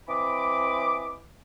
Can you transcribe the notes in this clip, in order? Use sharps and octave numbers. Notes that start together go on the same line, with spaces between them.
E3 C4 D#5 B5 D6